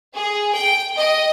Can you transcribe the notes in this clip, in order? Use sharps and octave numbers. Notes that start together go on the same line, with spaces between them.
G#4
G5
D#5